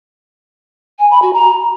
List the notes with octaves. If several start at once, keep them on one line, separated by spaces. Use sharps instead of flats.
G#5
B5
F#4
A#5